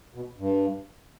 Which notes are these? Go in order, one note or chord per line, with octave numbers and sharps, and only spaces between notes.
B2
G2